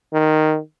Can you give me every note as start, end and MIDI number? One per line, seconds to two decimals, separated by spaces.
0.13 0.58 51